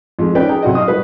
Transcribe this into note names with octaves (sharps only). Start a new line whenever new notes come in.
F2 G#3 F4
C#4 D#4 B4 D5 G5
G#4 G5 A#5
B1 C3 F#4 D5 D#5
D#5 F5 C#6 D#6
G3 B4